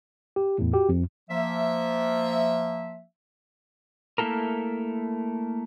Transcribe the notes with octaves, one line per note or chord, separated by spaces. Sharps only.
G4
E2 A2
F#4 G4
F2
F3 A#3 E5
A3 A#3 E4 F4 A4 A#4